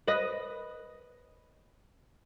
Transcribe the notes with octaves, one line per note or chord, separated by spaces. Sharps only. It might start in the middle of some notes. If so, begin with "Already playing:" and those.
B4 D#5